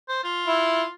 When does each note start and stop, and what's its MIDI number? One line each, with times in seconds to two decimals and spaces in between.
0.09 0.22 72
0.24 0.91 65
0.47 0.82 64